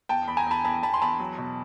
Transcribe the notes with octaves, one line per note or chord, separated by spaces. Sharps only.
E2 G5 A5
E2 B5
G#5 A#5
E2 A5 B5
E2 A5 B5
E2 A5 B5
C6
E2 A5 B5
F#3
B2